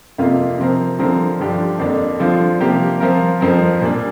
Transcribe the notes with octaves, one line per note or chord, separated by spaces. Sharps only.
F2 C3 A#3 F4
C3 F3 C4 A#4
D3 F3 C4 A#4
G2 D3 F3 D4 G4
F2 D3 A#3 D4
D3 F3 C4 F4
C3 F3 A#3 G4 A#4
F3 C4 F4 A#4
F2 F3 C4 A#4
A#2 G3 D4